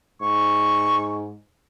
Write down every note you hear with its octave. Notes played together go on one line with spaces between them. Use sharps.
G#2 C#6